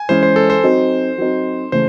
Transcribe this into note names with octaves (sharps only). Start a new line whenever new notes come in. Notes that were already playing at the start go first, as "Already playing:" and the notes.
Already playing: G#5
E3 G#3 C#4 E4 C5
C5
A4
C5
F#3 C4 D#4
F#3 C4 D#4
C#3 E3 A3 C5